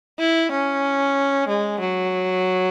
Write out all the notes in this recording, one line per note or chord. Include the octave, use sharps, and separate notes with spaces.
E4
C#4
G#3
F#3